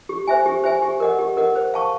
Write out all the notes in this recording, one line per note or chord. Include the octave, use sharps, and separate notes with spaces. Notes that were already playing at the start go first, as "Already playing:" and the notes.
G4
C5 E5 G#5
G4
C5 E5 G#5
G4
A#4 D#5 F#5
G4
A#4 D#5 F#5
C5
F5 A5 C#6